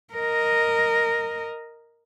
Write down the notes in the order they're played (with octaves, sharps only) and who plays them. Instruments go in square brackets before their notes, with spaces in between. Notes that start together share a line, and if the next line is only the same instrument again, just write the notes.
[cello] A#4 D#5